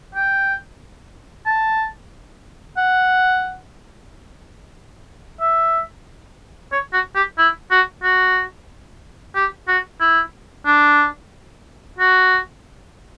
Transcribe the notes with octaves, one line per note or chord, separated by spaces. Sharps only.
G5
A5
F#5
E5
C#5
F#4
G4
E4
F#4
F#4
G4
F#4
E4
D4
F#4